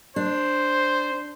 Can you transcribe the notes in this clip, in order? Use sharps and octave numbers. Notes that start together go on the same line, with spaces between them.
D4 C5